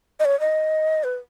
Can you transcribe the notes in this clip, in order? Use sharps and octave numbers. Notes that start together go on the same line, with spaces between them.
D#5
C#5
D#5
B4